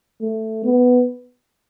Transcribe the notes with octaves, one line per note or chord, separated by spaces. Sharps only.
A3
B3